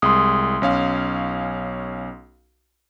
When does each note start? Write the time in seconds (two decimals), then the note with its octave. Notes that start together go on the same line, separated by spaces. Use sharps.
0.02 C2 G#3 C6 D#6
0.62 B1 C#4 F5